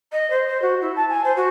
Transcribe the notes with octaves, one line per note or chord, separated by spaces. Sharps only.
D#5
C5
C5
F#4
E4
A5
G#5
C5
F#4